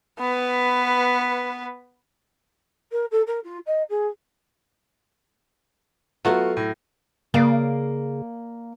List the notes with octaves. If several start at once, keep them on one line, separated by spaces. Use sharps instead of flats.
B3 B4
A#4
A4
A#4
F4
D#5
G#4
F#3 A3 B3 F4 F#4 F#5
A2
C#3 A#3 D5 F5